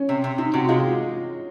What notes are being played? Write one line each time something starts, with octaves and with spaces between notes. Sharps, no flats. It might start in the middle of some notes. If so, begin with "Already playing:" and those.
Already playing: C#4
C3
C3
C3 D#4
C3 F#4
G#3 F4